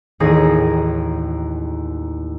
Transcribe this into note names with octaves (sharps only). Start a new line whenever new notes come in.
A1 D#2 D#4 G#4 D#6 A#6